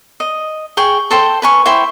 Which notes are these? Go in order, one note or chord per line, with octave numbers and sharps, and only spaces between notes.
D#5
G#4 G5 C#6
A4 C5 G5
B4 G#5 C#6
E4 C5 G5 C#6